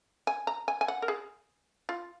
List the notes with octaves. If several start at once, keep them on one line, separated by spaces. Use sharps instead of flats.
G#5
A#5
G#5
G#5
F#5
A#4
G#4
F4